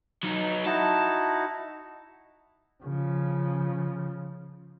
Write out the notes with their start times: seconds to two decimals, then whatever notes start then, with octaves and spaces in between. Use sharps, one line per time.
0.23 F#3 D#4
0.66 D#4 E4 F#4 A5
2.84 C#3 F3